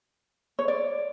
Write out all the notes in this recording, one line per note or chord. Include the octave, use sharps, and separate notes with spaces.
C#5
D5